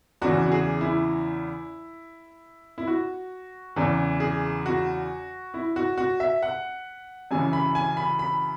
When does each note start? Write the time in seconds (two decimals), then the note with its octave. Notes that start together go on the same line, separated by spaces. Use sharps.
0.22 E2 C#3 E3 F#4
0.46 F#4
0.52 G#4
0.81 E4
2.78 E4
2.87 F#4
3.76 E2 C#3 E3
4.20 G#4
4.66 F#4
5.54 E4
5.76 F#4
5.98 F#4
6.20 E5
6.43 F#5
7.31 F#2 C#3 E3 G#5
7.53 B5
7.75 G#5
7.97 B5
8.19 B5